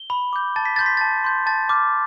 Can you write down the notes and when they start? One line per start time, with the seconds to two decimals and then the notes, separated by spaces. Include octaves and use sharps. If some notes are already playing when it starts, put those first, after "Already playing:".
Already playing: G7
0.10 B5
0.33 D6 G6
0.56 A5 A6
0.66 B6
0.76 C6 G6 A6
0.86 B6
0.97 A5 A6
1.24 C6 G6
1.46 A5 A6
1.69 D6 F6